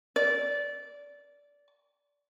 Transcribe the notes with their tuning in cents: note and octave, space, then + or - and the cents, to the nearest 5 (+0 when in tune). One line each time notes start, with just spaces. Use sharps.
D5 -20